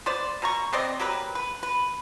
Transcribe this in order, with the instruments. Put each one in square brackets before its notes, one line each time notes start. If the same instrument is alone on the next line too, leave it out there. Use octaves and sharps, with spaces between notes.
[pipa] B3 C5 D5
B2 A#5 C#6
B3 C4 D5 D#5
F#3 G4 A#4 B4
B4
B4